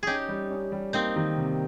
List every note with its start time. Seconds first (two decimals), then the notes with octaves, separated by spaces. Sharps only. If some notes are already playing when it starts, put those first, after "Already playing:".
0.03 C#4 D#4 G4 G#4
0.28 G3
0.51 C#4
0.72 G3
0.93 A#3 C4 D#4
1.16 D#3
1.38 C3